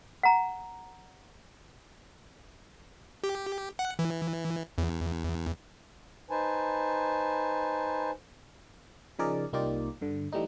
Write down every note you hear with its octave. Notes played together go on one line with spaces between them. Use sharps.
F#5 A#5
G4
F#5
E3
E2
D#4 B4 C5 G#5 A5
C#3 F3 D#4 G#4 A#4 D5
C2 A#3 D#4 F4 G4 D5
G2 D3
E3 G3 A3 D#4